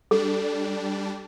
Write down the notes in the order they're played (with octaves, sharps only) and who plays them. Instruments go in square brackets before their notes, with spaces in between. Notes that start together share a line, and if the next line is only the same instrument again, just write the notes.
[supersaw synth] G3 D4 [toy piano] A4